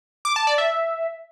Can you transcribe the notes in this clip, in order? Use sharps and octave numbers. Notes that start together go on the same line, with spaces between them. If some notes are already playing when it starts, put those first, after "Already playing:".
D6
A5
D5
E5